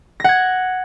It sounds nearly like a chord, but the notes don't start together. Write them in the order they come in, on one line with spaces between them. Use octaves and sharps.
A#6 F#5 G#6